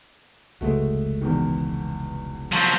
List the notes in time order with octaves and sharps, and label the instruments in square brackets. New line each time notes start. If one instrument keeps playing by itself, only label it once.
[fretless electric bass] F1 C#2 G#3 [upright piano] A3 F#4
[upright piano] E2 B2 D#3
[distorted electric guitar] F3 F#3